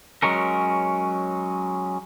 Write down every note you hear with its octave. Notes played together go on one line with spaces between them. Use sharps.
F#3 G#3 C#4 A#4